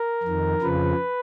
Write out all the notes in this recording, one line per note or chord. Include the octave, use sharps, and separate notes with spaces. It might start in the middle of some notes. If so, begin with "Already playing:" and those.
Already playing: A#4
F2 D#3
F2 C#3 F3 B4